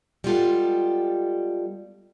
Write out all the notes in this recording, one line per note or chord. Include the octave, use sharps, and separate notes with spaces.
G3 G#3 B3 F4 G4 A4